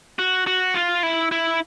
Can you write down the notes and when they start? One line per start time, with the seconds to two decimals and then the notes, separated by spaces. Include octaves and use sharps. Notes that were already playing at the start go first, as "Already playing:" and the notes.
0.19 F#4
0.47 F#4
0.75 F4
1.03 E4
1.31 E4